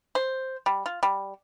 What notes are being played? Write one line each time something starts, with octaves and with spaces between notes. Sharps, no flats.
C5
G3
F4
G3